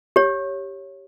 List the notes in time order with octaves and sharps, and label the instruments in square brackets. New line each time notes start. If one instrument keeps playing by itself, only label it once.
[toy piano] G4 C#5